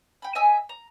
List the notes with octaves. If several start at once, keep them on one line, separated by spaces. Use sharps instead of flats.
G5 B5
D#5 E5 G#5 E6
A#5